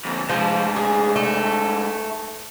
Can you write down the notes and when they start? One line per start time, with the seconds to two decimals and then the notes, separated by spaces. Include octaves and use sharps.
0.05 F2 D3
0.29 G2 F3 G#3
0.76 G#4
1.16 A3